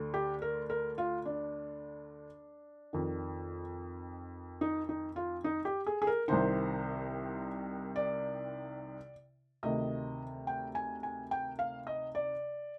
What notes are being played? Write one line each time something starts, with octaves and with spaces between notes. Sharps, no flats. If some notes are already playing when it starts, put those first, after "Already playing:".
Already playing: D2 D3
G4
A#4
A#4
F4
D4
F2 D#3
D#4
D#4
F4
D#4
G4
G#4
G#4
A#4
C2 C3 D#3 C5
D5
D2 C3 D#3 D#5
G5
G#5
G#5
G5
F5
D#5
D5